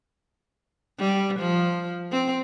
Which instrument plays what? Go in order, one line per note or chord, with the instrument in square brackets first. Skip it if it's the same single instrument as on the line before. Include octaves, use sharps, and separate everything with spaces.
[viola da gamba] G3
F3
C4